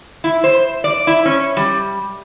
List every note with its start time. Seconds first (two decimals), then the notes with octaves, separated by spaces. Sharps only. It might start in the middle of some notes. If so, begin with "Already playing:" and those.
0.24 E4
0.44 C5
0.84 D5
1.07 E4
1.26 C#4
1.57 G3